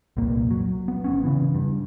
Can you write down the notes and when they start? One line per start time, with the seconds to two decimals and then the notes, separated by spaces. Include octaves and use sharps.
0.17 C2 F2 A#2 A#3
0.51 F#3
0.88 B3
1.04 G1 B3 C#4
1.24 C#3 E3
1.55 G2